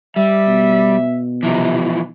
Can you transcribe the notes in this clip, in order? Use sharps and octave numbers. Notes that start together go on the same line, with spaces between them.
G3 E5
B2
C3 E3 F3 D#4